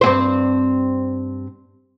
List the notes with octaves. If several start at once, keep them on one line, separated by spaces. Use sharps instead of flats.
G2 C4 C5